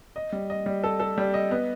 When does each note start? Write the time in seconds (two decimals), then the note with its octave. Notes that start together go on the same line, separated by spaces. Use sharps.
0.16 D#5
0.32 G3
0.50 D#5
0.66 G3
0.84 A4
1.00 A4
1.18 G3
1.34 D#5
1.51 B3